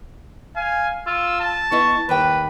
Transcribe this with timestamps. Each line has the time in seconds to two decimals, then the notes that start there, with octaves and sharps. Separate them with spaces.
0.56 F5 G#5
1.07 F4 E6
1.40 A5
1.71 B3 E4 D#5 C#6
2.09 D#2 B4 G5